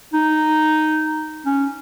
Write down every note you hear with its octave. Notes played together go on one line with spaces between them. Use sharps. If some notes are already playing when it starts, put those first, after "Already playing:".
D#4
C#4